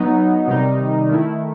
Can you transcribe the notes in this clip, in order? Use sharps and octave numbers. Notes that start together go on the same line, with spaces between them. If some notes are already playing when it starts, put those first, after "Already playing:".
Already playing: F#3 B3 D#4
C3 D#3 G3 D#4
D#3 A3 E4